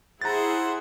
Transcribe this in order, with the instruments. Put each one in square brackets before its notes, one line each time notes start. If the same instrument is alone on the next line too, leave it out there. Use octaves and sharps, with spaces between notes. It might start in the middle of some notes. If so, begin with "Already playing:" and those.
[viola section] E4 G#4 [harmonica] C5 F#5 [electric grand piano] A#5 A6